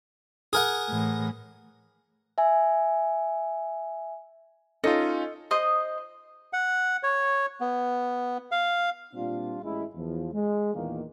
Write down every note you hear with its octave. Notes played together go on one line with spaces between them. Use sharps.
G#4 A#4 F#5
A2 E3
E5 G#5
C#4 D#4 F4 A4 D#5
C5 D#5 D#6
F#5
C#5
B3
F5
A#2 G3 C4 D4 F4
A1 G#3 E4
E2 F3
G#3
E2 A#2 D#3 A#3